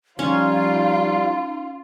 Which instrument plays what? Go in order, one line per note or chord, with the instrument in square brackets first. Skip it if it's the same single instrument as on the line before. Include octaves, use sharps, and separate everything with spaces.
[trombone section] F3 G3 [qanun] C#4 [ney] D#4 [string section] F4